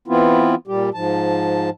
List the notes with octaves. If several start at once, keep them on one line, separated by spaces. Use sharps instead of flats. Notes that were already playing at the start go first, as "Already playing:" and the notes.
E3 B3 C4 E4 F4
A#2 G3 G4
G#2 F3 A5